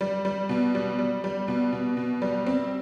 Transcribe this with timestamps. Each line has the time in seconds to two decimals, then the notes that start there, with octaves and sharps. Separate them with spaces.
0.01 G3
0.25 G3
0.49 B2
0.75 G3
0.99 G3
1.24 G3
1.48 B2
1.72 B2
1.97 B2
2.22 G3
2.46 C4